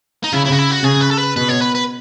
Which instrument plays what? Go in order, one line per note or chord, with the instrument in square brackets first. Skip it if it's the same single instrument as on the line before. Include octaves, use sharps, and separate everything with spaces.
[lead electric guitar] D#4
[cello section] C#3 [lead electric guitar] E4
[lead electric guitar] E4
F#4
E4
F#4
[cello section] C#3 [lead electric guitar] G#4
[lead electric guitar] B4
A4
B4
[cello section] B2 [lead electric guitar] B4
[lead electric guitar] C#5
B4
B4